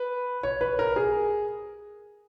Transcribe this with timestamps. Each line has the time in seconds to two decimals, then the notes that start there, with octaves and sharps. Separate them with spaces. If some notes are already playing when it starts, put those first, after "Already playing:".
Already playing: B4
0.43 C#5
0.61 B4
0.79 A#4
0.96 G#4